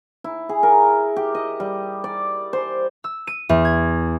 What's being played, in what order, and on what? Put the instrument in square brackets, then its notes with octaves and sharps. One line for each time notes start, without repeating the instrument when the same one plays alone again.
[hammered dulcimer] E4
G#4
A#4
G4
D#5
G3
D5
C5
[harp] E6
D#7
E2
G#6